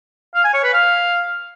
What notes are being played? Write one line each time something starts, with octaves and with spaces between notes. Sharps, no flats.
F5
G#5
C#5
B4
F5